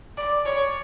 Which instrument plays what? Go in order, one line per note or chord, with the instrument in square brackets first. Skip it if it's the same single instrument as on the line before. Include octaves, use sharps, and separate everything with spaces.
[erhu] D5
C#5